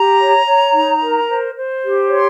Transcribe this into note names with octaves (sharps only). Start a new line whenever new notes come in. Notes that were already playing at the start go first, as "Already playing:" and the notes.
Already playing: G4 A#5
C#5
C#5
D#4
A#4
C5
C5
G4
C#5 C6